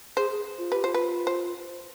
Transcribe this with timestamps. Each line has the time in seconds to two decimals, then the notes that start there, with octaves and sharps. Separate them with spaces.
0.17 G#4 C5
0.31 G#4
0.58 F4
0.72 G4 B4
0.84 F4 C5
0.94 B4
1.27 C5